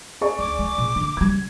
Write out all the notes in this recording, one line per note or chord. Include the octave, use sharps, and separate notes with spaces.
G#4 D5 C#6
D2 D6
G#3
A#2
D3
C#3 G3 G#6